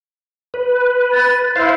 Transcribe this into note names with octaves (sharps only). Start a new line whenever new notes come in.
B4
A6
E4 C5 F5